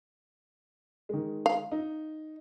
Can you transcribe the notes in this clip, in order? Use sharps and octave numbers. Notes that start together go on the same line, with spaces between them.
D#3 G#3
F5
D#4